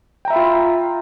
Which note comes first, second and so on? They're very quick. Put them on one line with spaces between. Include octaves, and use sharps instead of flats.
G5 A#5 E5 B5 F4